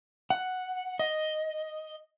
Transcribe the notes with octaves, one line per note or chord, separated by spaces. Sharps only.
F#5
D#5